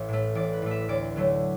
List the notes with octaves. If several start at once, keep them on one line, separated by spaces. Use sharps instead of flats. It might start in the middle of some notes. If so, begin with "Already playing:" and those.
Already playing: A1 E5
A2 A3
A1 D5
B4
A2 A3
E5
D2 D5
D3 F#3 A3